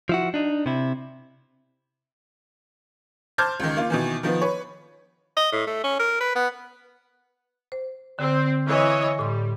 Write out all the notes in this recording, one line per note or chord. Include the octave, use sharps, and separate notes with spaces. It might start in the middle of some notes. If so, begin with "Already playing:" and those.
F3 E4 F#4
D4 D#4
C3 E4
C5 A5 D6 F6 G6 G#6
C#2 D#3
A#3 F4
B2 D#3 E3
D#3 F3 B3
B4 C#5
D#5
A2
A3
C#4
A#4
B4
B3
C5
D3 C4
E3 C#5 D#5
A2 G3 C6